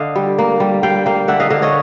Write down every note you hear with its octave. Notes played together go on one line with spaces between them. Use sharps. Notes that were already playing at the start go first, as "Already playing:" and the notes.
Already playing: D3 D#5 F5
G3
A#3
G3
G3 F5 G5
A#3 F5 G5
D3 E5 F#5
D#5 F5
D3 D#5 F5
C#5 D#5